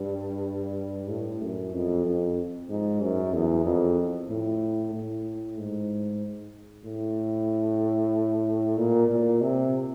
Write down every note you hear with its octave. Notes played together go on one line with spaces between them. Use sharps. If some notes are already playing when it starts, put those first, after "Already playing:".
Already playing: G2
A2
F#2
F2
F2
G#2
F#2
E2
F2
A2
A2
G#2
A2
A#2
A#2
C3